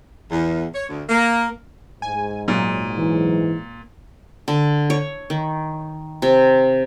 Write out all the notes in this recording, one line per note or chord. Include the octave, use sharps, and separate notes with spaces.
E2
C#5
D2
A#3
G#2 G#5
A#2 F#3
E3
D3
C#5
D#3
C3